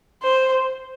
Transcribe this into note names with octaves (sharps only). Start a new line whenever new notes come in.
C5